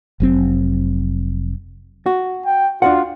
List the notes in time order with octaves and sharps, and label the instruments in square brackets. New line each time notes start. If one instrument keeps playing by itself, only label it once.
[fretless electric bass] F1 F#3 C4
[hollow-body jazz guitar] F#4
[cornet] G5
[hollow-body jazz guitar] D4 F#4 F#5 [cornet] F4